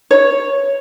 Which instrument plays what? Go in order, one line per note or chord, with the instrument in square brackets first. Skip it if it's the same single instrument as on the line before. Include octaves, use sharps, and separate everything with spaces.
[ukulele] C#5